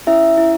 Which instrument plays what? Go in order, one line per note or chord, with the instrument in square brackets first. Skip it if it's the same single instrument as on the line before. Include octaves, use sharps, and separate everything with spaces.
[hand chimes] C#4 E4 E5
E4